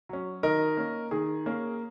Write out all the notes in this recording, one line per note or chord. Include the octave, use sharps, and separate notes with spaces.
F#3 C#4
D#3 A#4 D#5
A#3 C#4
D#3 G#4
A#3 C#4